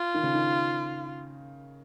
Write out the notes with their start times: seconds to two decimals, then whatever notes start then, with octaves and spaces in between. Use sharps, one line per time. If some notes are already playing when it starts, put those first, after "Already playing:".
Already playing: F4
0.14 D#3
0.23 C#3
0.34 D#3